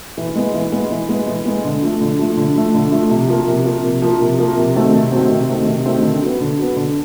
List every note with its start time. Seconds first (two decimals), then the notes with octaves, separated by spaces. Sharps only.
0.17 E3
0.35 G#3 B3
0.54 E3
0.72 G#3 B3
0.91 E3
1.09 G#3 B3
1.28 E3
1.45 G#3 B3
1.65 D3
1.82 F3 A3
2.01 D3
2.19 F3 A3
2.37 D3
2.55 F3 A3
2.74 D3
2.92 F3 A3
3.11 C3
3.28 F3 A#3
3.47 C3
3.66 F3 A#3
3.83 C3
4.02 F3 A#3
4.21 C3
4.38 F3 A#3
4.57 C3
4.75 D#3 F#3 A3 C4
4.93 C3
5.12 D#3 F#3 A3 C4
5.30 C3
5.48 D#3 F#3 A3 C4
5.68 C3
5.85 D#3 F#3 A3 C4
6.03 D3
6.21 F#3 B3
6.40 D3
6.58 F#3 B3
6.76 D3